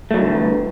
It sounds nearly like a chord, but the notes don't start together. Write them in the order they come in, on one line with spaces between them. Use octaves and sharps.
A3 F#3 G2 D3 E3